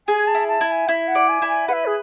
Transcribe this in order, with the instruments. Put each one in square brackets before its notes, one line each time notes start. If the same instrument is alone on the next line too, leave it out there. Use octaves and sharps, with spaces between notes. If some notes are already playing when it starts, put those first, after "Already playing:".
[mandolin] G#4 [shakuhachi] G#5
[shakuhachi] A5
[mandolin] E4
[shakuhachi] A5
[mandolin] E4
[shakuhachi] A5
G#5
[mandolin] E4 [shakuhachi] E5
[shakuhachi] F#5
[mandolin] D5
[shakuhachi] G#5
[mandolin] E4
[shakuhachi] G#5
[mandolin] B4 [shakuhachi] E5 F#5
[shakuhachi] G#4